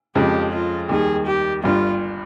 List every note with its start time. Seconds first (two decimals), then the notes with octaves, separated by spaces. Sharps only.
0.15 F2 C#3 F3 G#3 G4
0.53 F4
0.89 D#2 D#3 G3 G#4
1.26 G4
1.63 G1 G2 G3 F4